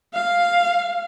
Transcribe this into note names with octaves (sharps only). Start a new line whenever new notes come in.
F5